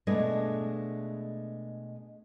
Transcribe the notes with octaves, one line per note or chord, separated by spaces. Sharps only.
B2 G#3 A3 D4 G#4 B4